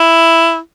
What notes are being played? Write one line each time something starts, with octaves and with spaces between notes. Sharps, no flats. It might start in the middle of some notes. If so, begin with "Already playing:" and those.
Already playing: E4